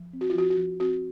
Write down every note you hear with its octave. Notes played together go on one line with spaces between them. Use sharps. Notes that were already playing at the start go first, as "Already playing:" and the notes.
Already playing: F3
C4
F#4
F4
F3 F#4
F#4
F3
C4 F#4